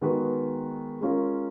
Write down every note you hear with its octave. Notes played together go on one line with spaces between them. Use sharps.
D#3 G#3 B3 F#4 B4
G#3 C#4 F4 A#4